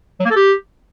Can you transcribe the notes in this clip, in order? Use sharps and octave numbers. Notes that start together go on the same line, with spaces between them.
F#3
A#3
A4
G4